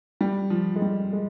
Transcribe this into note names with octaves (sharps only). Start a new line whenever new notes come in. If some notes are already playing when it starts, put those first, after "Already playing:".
G3
F3
G#3
G3
G#3